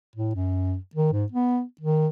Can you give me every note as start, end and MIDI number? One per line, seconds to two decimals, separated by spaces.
0.16 0.34 45
0.35 0.76 42
0.95 1.11 51
1.12 1.24 44
1.32 1.62 59
1.81 2.07 51